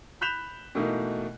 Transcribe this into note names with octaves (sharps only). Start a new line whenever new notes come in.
B5 F#6 G6 B6 E7 F7
B2 E3 A3 A#3 D#4